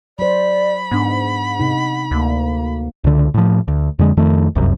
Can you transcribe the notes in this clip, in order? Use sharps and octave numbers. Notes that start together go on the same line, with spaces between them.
F#3 C5 D5 B5
G#2 B3 D4 F#5
C3 D#4
D2 A#3
C#2 D3
A2 F3
D2
F2 D3 G#3
F2 D#3 A3
F1 C2 F#2